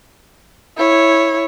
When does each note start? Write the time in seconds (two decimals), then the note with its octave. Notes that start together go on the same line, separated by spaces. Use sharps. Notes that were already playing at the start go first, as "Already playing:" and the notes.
0.77 E4 C#5